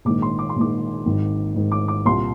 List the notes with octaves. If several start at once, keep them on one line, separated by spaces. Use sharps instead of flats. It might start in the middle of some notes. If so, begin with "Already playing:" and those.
A#1 G#2 D#3 D6
C6
D6
C6
A#1 G#2 D#3 D6
G#1 G#2 D#3
G#1 G#2 D#3
D6
D6
C2 A#2 C6